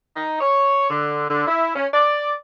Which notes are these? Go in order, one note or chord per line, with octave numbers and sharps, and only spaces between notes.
D#4
C#5
D3
D3
E4
C#4
D5